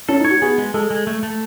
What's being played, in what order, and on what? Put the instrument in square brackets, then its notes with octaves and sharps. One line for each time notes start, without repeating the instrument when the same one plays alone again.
[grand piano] C#4 [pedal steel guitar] A4
[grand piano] D#4
[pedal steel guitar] C#5
[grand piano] F#4
[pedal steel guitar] B3 [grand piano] G#4
[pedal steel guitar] G#3
[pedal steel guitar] G#3 [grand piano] A4
[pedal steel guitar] G#3
A3
A3